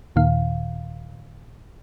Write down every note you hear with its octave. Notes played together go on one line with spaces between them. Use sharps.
D#2 A#2 D#3 F5